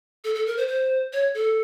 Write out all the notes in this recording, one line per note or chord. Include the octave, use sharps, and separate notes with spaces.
A4
A4
A#4
C5
C5
C#5
A4